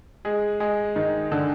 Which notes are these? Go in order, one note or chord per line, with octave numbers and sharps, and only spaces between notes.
G#3 G#4
G#3 G#4
D#3 D#4
D3 D4